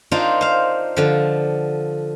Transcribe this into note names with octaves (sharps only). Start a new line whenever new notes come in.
D4 D#4 F4 A#4 C5
C5 F5
D3 F3